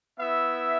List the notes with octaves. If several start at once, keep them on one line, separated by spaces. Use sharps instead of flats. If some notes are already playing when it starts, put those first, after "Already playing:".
B3 E4 E5